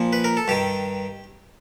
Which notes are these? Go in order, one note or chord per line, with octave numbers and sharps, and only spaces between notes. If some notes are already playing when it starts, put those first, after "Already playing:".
Already playing: A#2 F3
B4
A#4
A4
G2 D#3 G4